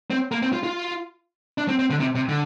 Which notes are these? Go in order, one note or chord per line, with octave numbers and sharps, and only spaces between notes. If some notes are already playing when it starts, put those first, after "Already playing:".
C4
A#3
C4
F4
F4
D4
C4
C4
D3
C3
C3
D3